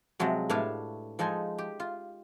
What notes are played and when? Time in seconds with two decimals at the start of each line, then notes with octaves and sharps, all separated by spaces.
0.20 C3 F3 F#3 G#3
0.50 A2 D4 B4 C#5 E5 F5
1.19 F3 G#3 D#4 A4 G#5
1.58 G4
1.80 F4